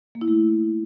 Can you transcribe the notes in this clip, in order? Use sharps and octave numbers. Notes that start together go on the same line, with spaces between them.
A#3
E4
A3